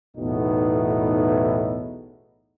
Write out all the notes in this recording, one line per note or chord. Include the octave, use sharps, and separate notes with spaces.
B1 E2 A2 B3 D#4